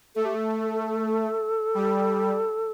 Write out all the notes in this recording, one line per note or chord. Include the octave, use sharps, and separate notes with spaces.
A3 A4
G4
A4
G3